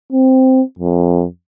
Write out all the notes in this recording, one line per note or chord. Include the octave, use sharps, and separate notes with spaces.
C4
F2